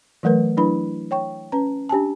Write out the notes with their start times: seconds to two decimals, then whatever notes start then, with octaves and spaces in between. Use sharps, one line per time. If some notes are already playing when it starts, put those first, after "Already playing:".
0.23 E3 F#3 A3 A#4 B4
0.57 F#3 D4 E4 B4 B5
1.11 C#5 G5 C#6
1.52 C#4 B4 A#5
1.89 D4 G4 G#5 A5